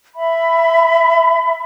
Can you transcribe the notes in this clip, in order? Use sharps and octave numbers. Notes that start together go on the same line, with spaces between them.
E5 B5